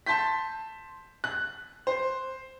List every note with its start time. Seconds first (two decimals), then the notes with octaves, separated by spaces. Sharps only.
0.06 A5 C6 G6 B6
1.24 F#6
1.87 C5